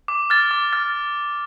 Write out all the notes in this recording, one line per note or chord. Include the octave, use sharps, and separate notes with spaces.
D6
F6 A6
D6
F6 A6